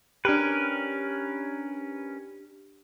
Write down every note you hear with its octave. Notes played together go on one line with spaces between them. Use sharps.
C#4 D4 G4 A#4 B4